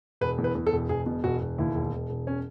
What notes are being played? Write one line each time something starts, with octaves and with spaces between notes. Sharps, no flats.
E1 B4
E2
B4
E2
A4
E1
E1 G#4
B2
E1 F#4
E1
D#2 E4
E1
E1
E1
C#4